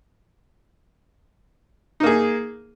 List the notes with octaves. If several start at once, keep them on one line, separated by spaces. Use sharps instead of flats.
A#3 D#4 G#4